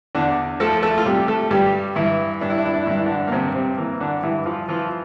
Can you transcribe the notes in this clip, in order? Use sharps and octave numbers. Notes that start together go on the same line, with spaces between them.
E2 D3 D4
F3 A3 A4
A3 A4
F4
C3 G3 G4
A3 A4
G2 G3 G4
G2 E3 E4
G2 D4
E4
D4
E4
D4
E4
G2 D4
E4
D3 D4
A#3
G2 C3 C4
C3 C4
E3 A#3
D3 D4
G2 E3 E4
F3 F4
E3 F3 F4